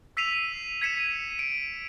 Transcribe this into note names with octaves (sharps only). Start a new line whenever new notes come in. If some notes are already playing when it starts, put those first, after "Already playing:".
E6 B6 C7 D#7 F7
G#6 B6 C#7 D#7 E7
D7